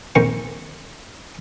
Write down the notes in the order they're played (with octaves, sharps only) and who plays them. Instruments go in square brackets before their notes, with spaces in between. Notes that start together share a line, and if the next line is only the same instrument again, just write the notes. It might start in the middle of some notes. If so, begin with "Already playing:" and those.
[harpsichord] A#1 F2 D#3 C5 C#6